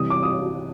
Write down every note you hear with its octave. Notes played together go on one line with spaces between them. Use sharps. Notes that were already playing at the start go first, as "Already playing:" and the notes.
Already playing: C3 E3 G3 D#6
D6
D#6